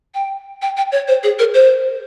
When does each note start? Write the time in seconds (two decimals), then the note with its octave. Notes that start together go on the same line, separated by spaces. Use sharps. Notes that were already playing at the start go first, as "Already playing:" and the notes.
0.15 G5
0.62 G5
0.77 G5
0.92 C#5
1.08 C5
1.23 G#4
1.39 A#4
1.54 C5